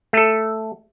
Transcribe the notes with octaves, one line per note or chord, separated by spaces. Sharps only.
A3 A4